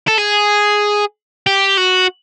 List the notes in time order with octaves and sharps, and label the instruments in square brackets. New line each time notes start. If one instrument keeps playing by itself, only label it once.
[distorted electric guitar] A4
G#4
G4
F#4